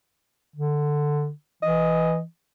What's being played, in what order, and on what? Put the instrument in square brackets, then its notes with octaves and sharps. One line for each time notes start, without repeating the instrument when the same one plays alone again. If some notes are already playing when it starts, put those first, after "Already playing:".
[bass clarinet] D3
[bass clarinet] E3 [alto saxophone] D#5